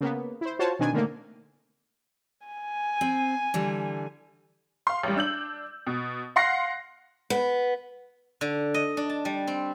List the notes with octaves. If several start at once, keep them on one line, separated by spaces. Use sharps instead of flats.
C#3 A#3 B3
E4 C5
F4 F#4 C5 C#5 A5
B2 D#3 C4 D4 G#5
A2 D3 D#3 A3 A#3
G#5
C4
D3 E3 G3
F5 C6
A1 G3
D4 E6 G6 F#7
B2
F5 F#5 C6 A#6 C7
B3
D3
D#5
D4
A5
G3
C4